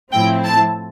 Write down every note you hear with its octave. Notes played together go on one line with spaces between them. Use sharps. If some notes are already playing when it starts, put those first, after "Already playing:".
A2 F3 C4 E4 G5
A5